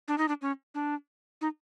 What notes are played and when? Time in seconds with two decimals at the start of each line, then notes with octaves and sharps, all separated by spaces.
0.08 D4
0.18 D#4
0.28 D4
0.42 C#4
0.74 D4
1.41 D#4